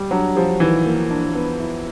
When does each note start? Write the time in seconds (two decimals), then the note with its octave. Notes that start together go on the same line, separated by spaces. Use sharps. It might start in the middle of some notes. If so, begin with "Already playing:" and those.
Already playing: G3
0.11 F#3 D4
0.36 F3 G3
0.60 D#3 E3
0.86 A#3
1.10 D4
1.34 B3
1.59 E4